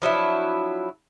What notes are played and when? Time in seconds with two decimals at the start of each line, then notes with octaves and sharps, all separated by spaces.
0.02 F3 F#3 D4 E4